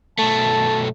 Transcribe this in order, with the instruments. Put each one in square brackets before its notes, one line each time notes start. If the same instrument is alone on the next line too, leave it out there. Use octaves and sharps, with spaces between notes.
[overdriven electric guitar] B1 A3 [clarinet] A5